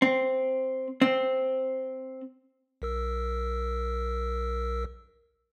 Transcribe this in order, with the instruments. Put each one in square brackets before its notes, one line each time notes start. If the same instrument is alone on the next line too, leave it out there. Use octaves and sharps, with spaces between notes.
[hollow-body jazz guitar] C4
C4
[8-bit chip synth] B1 A#4 E6